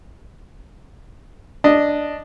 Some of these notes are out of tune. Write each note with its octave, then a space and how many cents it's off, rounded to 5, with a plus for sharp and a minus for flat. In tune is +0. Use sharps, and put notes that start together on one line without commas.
D4 +0 D#5 -5